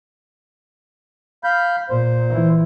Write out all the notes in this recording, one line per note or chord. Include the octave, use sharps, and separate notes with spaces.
F5 B5 G6
A#2 C5
E3